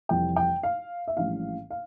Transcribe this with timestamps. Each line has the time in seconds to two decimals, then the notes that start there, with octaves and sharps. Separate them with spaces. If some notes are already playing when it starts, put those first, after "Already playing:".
0.09 F1 F2 E3 G3 G5
0.36 G5
0.63 F5
1.08 E5
1.17 A#1 A2 E3 G3 C#4 F5
1.70 F5